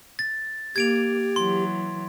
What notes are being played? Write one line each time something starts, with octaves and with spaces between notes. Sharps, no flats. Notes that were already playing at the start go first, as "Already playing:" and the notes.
A6
A#3 G4 G#6 D7 F7
E3 F#3 C6